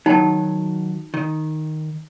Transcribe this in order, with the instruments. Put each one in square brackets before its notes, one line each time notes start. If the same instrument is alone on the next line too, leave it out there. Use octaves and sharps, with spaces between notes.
[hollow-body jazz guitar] D#3 F#3 [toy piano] D#4 G5 A5
[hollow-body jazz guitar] D#3